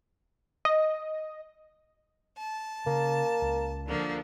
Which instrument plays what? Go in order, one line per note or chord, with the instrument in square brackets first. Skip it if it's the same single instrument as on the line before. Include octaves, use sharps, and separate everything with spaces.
[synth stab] D#5
[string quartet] A5
[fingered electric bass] C#3 [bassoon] A#3
[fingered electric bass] C#2
[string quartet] D3 F3 A#3